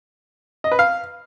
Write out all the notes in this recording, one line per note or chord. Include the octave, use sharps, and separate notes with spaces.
D#5
B4
F5